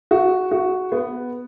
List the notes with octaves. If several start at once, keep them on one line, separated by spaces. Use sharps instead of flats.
F#4
F#4
B3